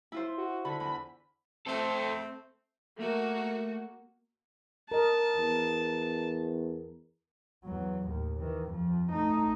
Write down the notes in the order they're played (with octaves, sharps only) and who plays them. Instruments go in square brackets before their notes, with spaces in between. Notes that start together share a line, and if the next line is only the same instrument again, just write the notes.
[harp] E4 F4 C5
[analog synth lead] F#4
[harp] D3 [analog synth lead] B5
[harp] E2 [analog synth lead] B5
[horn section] A3 C4 [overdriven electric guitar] A4 C5
[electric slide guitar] A3 [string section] A#3 F#4
[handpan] A#4 D#5 [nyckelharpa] A5
[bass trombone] E2
[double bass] E2 F#3
D#2 A2
D#3 E3
F2 F3
A3 D#4